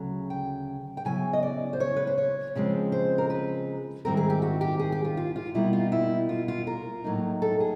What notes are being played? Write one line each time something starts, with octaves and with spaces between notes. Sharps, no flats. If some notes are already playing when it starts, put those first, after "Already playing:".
Already playing: D2 C#3 F#3
G5
G5
C#3 F#3 B3 E4 G#5
D#5
D5
C5
C#5
B4
C5
C#5
C#3 F3 G#3 C4
C5
A#4
B4
G#2 D#3 G3 C4 E4 A#4
G#4
G4
F#4
G4
G#4
G4
F4
F4
F4
B2 G3 A#3 D#4 E4
F4
E4
F4
F4
A#4
A2 F#3 A#3 D#4
A4
G#4